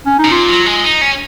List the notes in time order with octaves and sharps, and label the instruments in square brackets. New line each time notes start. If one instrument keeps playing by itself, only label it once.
[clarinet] C#4
D#4
[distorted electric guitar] B2
[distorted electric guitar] A#2 [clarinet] F4
[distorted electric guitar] F#3
G#3
D#4
C#4